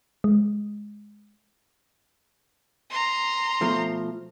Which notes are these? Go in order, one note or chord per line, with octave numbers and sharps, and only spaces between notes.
G#3
A#5 C6
B2 F3 A3